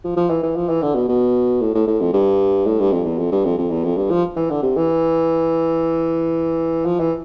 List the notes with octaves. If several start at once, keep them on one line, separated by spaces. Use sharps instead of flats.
F3
F3
E3
E3
F3
E3
D3
B2
B2
A2
A2
A2
F2
G2
A2
G2
F2
E2
F2
G2
F2
F2
E2
F2
G2
F3
E3
D3
C3
E3
F3
E3